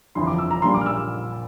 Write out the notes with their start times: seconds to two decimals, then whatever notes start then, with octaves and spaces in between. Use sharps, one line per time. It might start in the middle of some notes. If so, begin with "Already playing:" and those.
0.15 G1 F2 E3 C6
0.27 D6
0.39 E6
0.51 A#5
0.62 A#1 A#2 G3 C6
0.74 D6
0.81 F6
0.86 E6